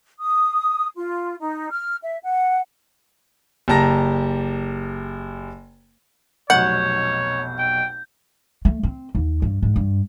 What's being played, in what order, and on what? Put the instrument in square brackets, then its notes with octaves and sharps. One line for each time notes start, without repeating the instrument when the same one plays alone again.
[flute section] D#6
F4
D#4
F6
E5
F#5
[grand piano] F#1 G4 A5 A#5 A#6
[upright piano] F1 B1 B2 [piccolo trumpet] C#5 [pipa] F#5 [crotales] G6
[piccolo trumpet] G5
[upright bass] A3
C4
D#2
G2
G#2
G2